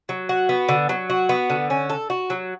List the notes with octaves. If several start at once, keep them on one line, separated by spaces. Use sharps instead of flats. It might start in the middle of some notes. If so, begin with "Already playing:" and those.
F#3
F#4
B3
D3
F#3
F#4
B3
D3
C#4
A4
F#4
F#3